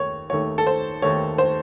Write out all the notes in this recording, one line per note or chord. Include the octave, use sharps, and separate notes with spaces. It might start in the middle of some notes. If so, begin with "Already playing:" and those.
Already playing: D#2 D#3 A3 C#5
D#2 D#3 A3 C#5
A4
C5
D#2 D#3 A3 C#5
C5